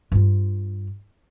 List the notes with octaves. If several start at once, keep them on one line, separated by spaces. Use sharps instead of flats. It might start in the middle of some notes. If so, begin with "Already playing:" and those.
G2 F4